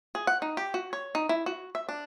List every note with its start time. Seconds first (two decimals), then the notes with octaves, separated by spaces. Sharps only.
0.15 G#4
0.27 F#5
0.42 D#4
0.57 G4
0.74 F#4
0.93 C#5
1.15 D#4
1.29 E4
1.46 F#4
1.75 E5
1.89 D4